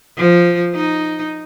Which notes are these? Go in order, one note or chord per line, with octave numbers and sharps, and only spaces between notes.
F3
D#4